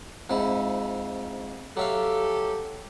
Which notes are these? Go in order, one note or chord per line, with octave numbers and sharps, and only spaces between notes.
F2 G#2 E4
F#3 G4 A4 E5 F5